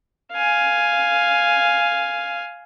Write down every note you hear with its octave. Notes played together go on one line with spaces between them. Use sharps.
F5 G#5